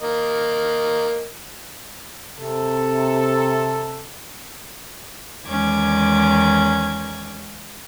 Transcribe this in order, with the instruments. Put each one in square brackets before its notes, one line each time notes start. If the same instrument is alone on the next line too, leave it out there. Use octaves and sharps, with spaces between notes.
[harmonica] A#3 D#5
[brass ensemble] C3 A4
[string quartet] E2 D#3 G#3 C#4 D6 G#6